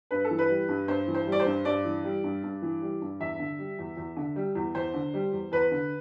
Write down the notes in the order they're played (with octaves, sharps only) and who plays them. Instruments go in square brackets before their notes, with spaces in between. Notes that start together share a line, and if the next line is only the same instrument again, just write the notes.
[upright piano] G2 B4
A4
E3
B4
G3
G2
G2 C5
E3
C5
G3 D5
C5
G2
G2 D5
E3
G3
G2
G2
E3
G3
G2
E2 E5
D3
G3
E2
E2
D3
G3
E2
E2 C5
D3
G3
E2
E2 B4
D3